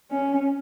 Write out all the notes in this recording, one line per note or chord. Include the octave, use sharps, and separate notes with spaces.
C#4